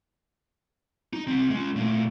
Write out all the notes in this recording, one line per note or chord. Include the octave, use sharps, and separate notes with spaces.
D#4
C2 C4
G#3 C#4
A#2 A3